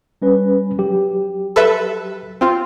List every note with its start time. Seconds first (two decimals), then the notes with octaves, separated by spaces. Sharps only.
0.22 G3 C#4 B4
0.79 F#3 G4
1.56 A4 B4 E5
2.41 C4 F4